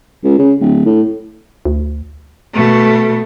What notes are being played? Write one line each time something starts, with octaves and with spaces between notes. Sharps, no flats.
C#2
C#3
D1
A2
D2
B2 A3